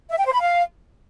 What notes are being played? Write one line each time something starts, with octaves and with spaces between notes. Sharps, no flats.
E5
G5
C5
B5
F5